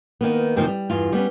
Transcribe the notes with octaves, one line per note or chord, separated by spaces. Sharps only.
D#3 A#3 B3
F#2 C3 D#3 F3 A#3 C4
G3
E2 G2 F4
G3 B3 C#4